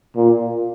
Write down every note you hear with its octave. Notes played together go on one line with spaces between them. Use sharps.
A#2